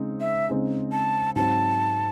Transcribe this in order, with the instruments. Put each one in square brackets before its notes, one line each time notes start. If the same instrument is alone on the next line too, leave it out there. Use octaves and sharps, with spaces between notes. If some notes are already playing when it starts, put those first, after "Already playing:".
Already playing: [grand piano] C#3 G#3 C4 D#4
[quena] E5
[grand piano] C#3 G#3 C4 D#4 G#4
[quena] A5
[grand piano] G#2 F#3 C4 [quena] A5